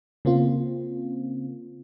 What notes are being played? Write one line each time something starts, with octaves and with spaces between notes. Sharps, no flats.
C#3 A#3 C4 F4